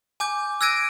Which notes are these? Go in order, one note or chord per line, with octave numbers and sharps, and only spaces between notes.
G#5 D6 G6
E6 F#6 G#6 A#6 D7 D#7